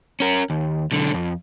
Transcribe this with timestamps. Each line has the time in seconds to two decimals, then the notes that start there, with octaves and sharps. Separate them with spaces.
0.20 C#4 A#4
0.50 D#2
0.92 B1 D3
1.11 C2 F2